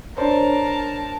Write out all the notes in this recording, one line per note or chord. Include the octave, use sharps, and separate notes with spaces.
D4 A#4 C5 C#5 A5